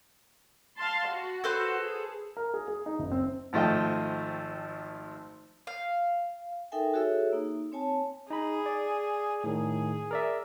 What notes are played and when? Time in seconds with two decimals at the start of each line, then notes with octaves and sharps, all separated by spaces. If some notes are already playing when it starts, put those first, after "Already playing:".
0.77 F5 A5 C6
1.07 F#4
1.44 A4 B4 C5
1.81 G#4
2.37 A#4
2.54 G#4
2.68 G#4
2.86 D#4
2.99 F#1
3.12 C4
3.53 G#1 F3 A3 D#5 G5
5.67 F5
6.72 D#4 A4 A#4 E5 G5 G#5
6.94 F#4 G#4 A4 C#5 E5 E6
7.33 A#3 D#4
7.72 C4 C#5 G#5 A5
8.30 D#4 G#4 B5
8.66 D5
9.44 A2 D#3 G#4
10.11 A#4 D5 E5